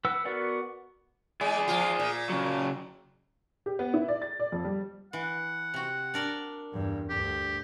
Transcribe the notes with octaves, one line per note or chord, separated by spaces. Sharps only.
B4 F#5 E6
B3 F#4 A#4 D5 F#5
G#3 G#4 D5
F3 F4
A#2
C#3 F#3
G4
B3
E4
D5
A6
D5
F2
G3
E3 F#5
C3 F#4
D4 A#4 D5
E2 G2
D2 G2 G4